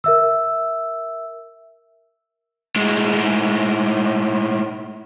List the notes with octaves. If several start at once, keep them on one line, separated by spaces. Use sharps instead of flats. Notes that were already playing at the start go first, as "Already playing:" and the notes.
A#4 E5 E6
A2 G#3